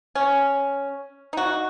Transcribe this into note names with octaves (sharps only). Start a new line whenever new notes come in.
C#4
D#4 F#4